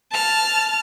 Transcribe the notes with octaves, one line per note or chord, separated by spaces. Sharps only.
A5 F6